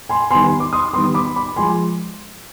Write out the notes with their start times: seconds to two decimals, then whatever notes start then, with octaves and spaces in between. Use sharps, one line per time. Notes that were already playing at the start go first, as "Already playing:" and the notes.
0.09 G#5 C6
0.31 D#3 G3 B3 G#5 C6
0.47 C6
0.60 D6
0.73 C6 D#6
0.93 D#3 G3 B3 C6 D#6
1.14 B5 D6
1.36 B5 D6
1.56 F3 G#3 G#5 C6